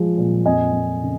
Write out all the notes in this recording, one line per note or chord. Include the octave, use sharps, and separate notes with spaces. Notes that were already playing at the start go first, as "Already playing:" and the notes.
Already playing: F3 G#3
A#2
F2 D#5 G#5
F2
C#3